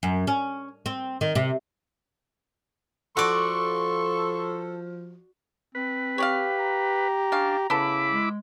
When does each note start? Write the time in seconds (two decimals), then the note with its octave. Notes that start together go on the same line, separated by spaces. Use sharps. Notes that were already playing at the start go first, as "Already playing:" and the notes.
0.03 F#2
0.27 C#4
0.86 C4
1.21 D#3
1.35 C3
3.17 F3 F#4 A4 D5 C6 C#6
5.75 C4 B4
6.18 G4 C#5 D5 F5
6.59 A#5
7.32 C#4 D4 F5
7.70 C#3 B3 E4 A4 B5 D6
8.11 G#3